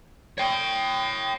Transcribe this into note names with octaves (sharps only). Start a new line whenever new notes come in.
C#5 G5